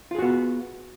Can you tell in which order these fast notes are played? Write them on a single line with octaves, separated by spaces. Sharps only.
F4 G#4 F#4 B3